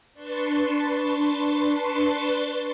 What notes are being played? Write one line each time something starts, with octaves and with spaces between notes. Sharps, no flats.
D4 B4 A5 C6 C#6 A6